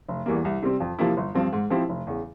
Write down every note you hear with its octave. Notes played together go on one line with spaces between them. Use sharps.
F1
E2 E3 G3 A#3
C2
C3 G3 C4
F2
C3 F3 A#3 E4
G1
G2 F3 C4
G#2
F3 C4 E4 G4
F1
E2 C#3